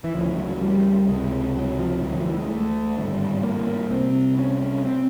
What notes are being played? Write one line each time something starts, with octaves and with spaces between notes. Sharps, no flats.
E3
D2 C#3 F3
F#3
G3
C#2 C3 G#3
F#3
F3
D2 D3 F#3
F3
E3
G#3
A3
G#1 G2 D3
A#3
A#3
C2 C3 C4
C#4
C#4
C4